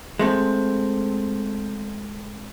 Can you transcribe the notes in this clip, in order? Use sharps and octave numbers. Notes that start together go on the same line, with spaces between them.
G#3 A3 C4